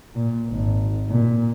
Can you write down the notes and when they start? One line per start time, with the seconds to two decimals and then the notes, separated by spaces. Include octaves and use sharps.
0.14 A#2
0.49 G#1
1.09 A#2